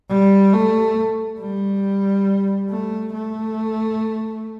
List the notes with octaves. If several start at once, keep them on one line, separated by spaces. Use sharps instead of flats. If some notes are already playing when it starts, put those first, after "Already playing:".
G3
A3
G3
A3
A3